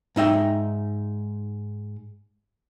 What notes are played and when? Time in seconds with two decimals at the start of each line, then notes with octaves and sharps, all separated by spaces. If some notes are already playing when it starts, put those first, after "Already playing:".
0.16 G#2 D#4 E5 G5